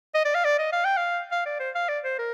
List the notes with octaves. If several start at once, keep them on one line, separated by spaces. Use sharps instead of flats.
D#5
D5
F5
D5
D#5
F5
G5
F5
F5
D5
C5
F5
D5
C5
A#4